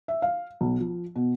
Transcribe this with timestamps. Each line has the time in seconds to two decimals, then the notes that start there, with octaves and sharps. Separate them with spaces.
0.08 E5
0.22 F5
0.61 B1
0.80 F3
1.16 B2